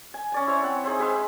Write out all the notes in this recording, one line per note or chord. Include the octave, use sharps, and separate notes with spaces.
G#5
C#4 D5 G#5
E4 C5 C#5 E5
C4 F#5
D#4 G#4 C5 E5
G#3 B4 E5 C6